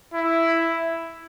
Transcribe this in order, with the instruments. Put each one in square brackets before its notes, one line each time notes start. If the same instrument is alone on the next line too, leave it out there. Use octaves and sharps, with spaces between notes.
[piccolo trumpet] E4